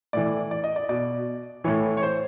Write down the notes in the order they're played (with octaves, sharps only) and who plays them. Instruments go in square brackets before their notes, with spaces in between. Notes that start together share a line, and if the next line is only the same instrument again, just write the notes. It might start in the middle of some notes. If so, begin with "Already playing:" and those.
[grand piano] A2 E3 D5
D5
D#5
D5
B2 D5
A2 E3 C#5
C#5
C5